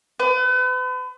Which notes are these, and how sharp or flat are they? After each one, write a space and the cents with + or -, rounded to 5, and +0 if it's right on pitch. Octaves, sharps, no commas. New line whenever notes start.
B4 +40